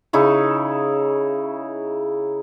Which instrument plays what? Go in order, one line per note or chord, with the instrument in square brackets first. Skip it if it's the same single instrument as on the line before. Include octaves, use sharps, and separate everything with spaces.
[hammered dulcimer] C#3 D#4 E4 C#6